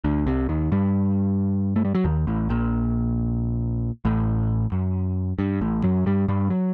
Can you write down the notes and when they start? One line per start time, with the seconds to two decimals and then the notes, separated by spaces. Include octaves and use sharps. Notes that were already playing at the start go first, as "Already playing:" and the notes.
0.04 D2 D3
0.26 C2 C3
0.49 D#2 D#3
0.72 G2 G3
1.76 A3
1.85 G3
1.95 F#3
2.05 D#2 D#3
2.27 A1 A2
2.49 A#1 A#2
4.05 A1 A2
4.72 F#2
5.39 G2
5.61 A1 A2
5.83 F#2 F#3
6.06 G2 G3
6.28 G2 G3
6.50 F#3